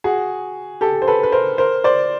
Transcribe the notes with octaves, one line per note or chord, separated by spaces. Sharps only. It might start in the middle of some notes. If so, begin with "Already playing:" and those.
F#4 G#4
G4 A4
C5
A4 B4
B4
A#4 C5
A#4 C5
C5 D5